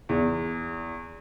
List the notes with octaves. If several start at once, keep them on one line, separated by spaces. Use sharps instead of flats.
E2